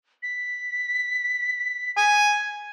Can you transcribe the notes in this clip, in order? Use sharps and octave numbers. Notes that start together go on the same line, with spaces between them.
B6
G#5 G#6